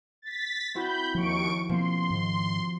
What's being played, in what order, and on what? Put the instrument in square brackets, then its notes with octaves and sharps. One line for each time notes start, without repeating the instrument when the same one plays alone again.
[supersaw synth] A6 B6
[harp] C4 E4 F#4 [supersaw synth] B5 G6
[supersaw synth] D#2 C#6 D7 [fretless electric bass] F3
[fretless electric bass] B2 A#3 C4 [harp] F3 [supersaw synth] C6
[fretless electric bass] G#2 D#3